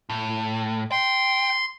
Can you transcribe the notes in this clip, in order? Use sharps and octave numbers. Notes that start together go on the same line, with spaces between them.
A2
G5 C6